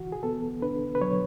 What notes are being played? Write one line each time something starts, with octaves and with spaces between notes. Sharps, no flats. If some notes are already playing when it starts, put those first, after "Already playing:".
Already playing: E3 F#4
G#4
B3 A4
D4 B4
B4
F#3 C#5